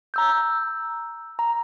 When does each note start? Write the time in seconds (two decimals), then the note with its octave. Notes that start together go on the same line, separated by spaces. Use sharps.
0.14 A#5 E6 G6
1.39 A#5